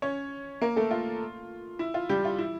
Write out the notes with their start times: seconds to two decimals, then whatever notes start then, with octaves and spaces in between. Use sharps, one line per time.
0.02 C#4 C#5
0.61 A#3 A#4
0.76 A3 A4
0.91 F4
1.79 E4
1.94 F4
2.09 G3 G4
2.25 F4
2.38 E4